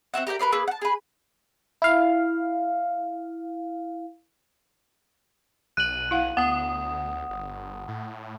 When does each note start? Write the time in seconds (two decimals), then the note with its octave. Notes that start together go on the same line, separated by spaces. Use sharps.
0.14 C4 F#4 E5 F#5
0.27 G4 A#4 D5 G5
0.39 A#4 B4 D5 C6
0.52 A#3 G#4 B4 E6
0.68 F#5 A5
0.82 G#4 B4
1.82 E4 F5
5.77 B1 F#6 D#7 F#7
6.11 E4 F5 F#5
6.37 D2 B3 F#5 D#6
7.29 G1
7.88 A2